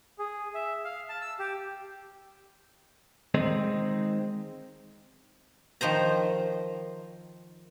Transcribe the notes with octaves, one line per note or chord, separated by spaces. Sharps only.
G#4
E5
F5
A5
E6
G4
D#3 G#3 C4 D#4
D#3 F3 C5 A#5